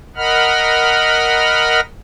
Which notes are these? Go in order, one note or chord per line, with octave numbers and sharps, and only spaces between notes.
A#4 D#5 F#5 B5 F6